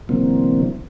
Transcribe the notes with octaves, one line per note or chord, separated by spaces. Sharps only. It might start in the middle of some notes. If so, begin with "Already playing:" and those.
B2 D3 E3 F#3 A#3 C4